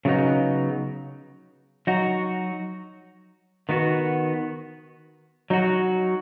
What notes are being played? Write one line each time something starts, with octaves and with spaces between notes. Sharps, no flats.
C#3 F#3 B3 D#4
F#3 D#4 F#4
D#3 B3 F#4
F#3 D#4 F#4